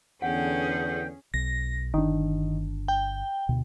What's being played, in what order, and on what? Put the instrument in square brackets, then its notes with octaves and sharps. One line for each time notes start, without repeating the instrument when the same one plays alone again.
[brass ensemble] E2 D3 [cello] C#4 G#4 [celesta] F#5 [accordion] G5
[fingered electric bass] B1 [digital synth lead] A#6
[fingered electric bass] G1 D4 [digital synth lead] D#3
[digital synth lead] G5
[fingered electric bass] D2 B2